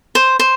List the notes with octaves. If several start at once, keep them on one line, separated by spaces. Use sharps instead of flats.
C5
C5